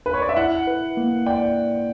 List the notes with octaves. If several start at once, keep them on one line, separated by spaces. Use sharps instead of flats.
B4
C#5
D5
E5
E4 F#5
B4
A#3
D5 G5